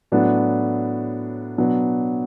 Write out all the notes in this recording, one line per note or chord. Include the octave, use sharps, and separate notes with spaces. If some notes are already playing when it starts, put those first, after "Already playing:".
A2 F#3 B3 D4
B2 F#3 B3 D4